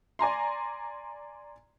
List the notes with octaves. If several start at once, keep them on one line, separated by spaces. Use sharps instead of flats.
D5 G#5 A#5 C6